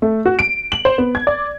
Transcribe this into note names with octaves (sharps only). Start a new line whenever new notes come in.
A3
F#4
D7
F#7
C5
B3
G#6
D5